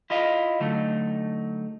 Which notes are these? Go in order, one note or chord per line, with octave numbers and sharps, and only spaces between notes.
E4 F4 D#5 F5
D3 F#3 A3 D#4